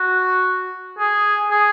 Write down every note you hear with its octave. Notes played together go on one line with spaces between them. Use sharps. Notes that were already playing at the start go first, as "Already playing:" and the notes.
Already playing: F#4
G#4
G#4